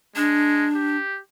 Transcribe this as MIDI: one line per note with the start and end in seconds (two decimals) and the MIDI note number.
0.16 0.67 56
0.16 0.97 62
0.75 1.19 67